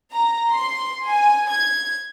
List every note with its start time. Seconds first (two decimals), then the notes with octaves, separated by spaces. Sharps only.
0.12 A#5
0.50 C6
1.06 G#5
1.50 G#6